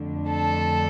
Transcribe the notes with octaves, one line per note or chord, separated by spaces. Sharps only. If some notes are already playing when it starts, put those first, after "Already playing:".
Already playing: F2 D3 A3 D4
A4 A5